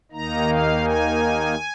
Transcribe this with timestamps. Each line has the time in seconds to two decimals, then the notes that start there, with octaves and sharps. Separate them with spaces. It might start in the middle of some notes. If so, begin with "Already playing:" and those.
0.12 D#2 D#3 A#3 D#4 A#5
0.48 F5
0.84 G#5